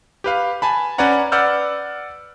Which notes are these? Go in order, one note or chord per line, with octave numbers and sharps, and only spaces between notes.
G4 B4 F5
G#5 A5 B5
C#4 B4 C#5 D5 F#5 A#5
B4 D5 F#5 E6 F6 G6